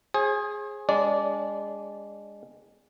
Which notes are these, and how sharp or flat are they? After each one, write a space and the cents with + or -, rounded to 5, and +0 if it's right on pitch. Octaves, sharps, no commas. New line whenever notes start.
G#4 +0 C5 +45
G#3 -25 D4 -35 D5 -10